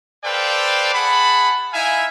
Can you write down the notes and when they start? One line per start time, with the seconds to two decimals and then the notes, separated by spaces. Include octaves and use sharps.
0.24 A4 B4 C5 D5 F5 G5
0.93 G#4 F#5 A5 B5
1.72 D#4 E4 E5 F5 G#5